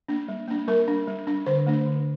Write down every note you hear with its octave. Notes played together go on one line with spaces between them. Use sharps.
A#3 D4
G3
A#3 D4
G3 A#4
D4
G3
D4
D3 C5
A3 D4
D3